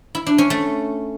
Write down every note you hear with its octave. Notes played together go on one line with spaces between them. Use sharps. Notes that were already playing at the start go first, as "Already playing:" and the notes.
E4
D4
C#4
A3